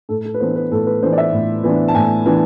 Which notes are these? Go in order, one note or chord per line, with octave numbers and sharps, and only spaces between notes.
A2 A4
A4
B4
E3 B3 D4 C5
B4
A2 A4
B4
E3 B3 D4 C5
D5
E5
A2
E3 B3 D4
A5
A2 G#5
E3 B3 D4